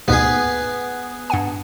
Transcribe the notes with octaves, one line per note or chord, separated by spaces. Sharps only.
D2 G#2 B2 B3 G#4
G2 F#5 G#5